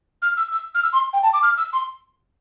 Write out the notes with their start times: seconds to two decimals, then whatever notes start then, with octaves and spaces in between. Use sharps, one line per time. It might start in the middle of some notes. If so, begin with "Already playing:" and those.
0.22 F6
0.37 E6
0.52 E6
0.75 F6
0.83 E6
0.93 C6
1.13 G5
1.23 A5
1.33 D6
1.43 F6
1.58 E6
1.73 C6